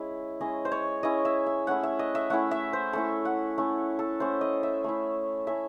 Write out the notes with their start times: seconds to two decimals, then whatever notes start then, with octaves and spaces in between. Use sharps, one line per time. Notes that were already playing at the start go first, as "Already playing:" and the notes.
Already playing: G#3 C#4 E4 E5
0.41 G#3 C#4 E4 D#5
0.65 C5
0.72 C#5
1.03 G#3 C#4 E4 D#5
1.25 E5
1.46 E5
1.67 A3 C#4 E4 F#5
1.83 E5
1.99 D#5
2.15 E5
2.30 A3 C#4 E4 F#5
2.51 E5
2.73 C5
2.93 A3 C#4 E4 A4
3.25 F#5
3.58 A3 C#4 E4
3.99 A4
4.20 A3 C#4 E4 C5
4.41 D#5
4.63 E5
4.84 A3 C#4 E4
5.47 A3 C#4 E4 E5